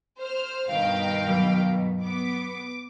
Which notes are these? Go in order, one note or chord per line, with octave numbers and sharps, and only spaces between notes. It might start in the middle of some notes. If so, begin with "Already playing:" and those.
C5 F6
G2 B2 D#3 F5 G5
F#3
B3 D6